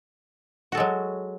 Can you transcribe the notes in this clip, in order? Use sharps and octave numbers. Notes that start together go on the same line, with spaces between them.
F#3 G#3 F#4 A4